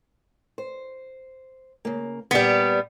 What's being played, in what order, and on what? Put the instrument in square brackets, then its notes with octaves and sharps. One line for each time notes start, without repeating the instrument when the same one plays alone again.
[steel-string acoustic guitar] C5
C#3 A#3
[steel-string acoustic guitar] A#2 D5 [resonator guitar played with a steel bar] G3 B3